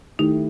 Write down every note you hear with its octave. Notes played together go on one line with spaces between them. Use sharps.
D#3 A3 D#4 E4 G4